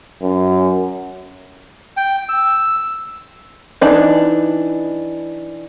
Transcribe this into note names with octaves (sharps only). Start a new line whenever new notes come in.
F#2
G5
E6
E3 D4 D#4